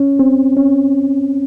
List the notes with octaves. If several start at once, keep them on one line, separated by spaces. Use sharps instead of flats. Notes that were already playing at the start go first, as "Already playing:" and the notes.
Already playing: C#4
C4
C#4